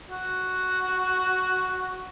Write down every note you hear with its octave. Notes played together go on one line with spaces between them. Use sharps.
F#4